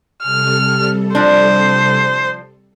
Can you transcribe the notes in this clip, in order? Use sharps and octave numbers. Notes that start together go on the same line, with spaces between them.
C3 G3 A4 F6
F3 D4 C5